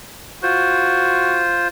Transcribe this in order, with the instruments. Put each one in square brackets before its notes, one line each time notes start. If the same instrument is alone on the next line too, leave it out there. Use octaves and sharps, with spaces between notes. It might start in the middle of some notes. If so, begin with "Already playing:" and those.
[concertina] F4 C5 [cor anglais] F#4